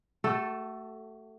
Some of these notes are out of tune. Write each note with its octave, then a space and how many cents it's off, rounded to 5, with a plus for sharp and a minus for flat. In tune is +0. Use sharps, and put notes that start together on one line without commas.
A3 +10 F#4 +35 A4 +0